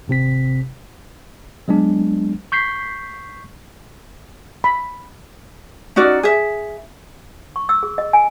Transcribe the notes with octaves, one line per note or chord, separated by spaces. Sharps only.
G#1 C3 C4 B6
F#3 G#3 B3 D4
C#6 G6 B6 C7
B5
C#4 D#4 F#4 D5
G#4 E5
C#6
E6
G#4
D#5
G#5